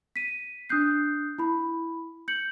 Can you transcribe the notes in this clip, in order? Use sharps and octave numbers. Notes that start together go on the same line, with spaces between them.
B6 D#7
D4 D#6 F#6 G6 C7
E4 B5
G6 C#7 F#7